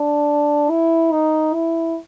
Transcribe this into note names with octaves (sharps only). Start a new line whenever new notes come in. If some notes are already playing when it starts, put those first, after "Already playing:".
Already playing: D4
E4
D#4
E4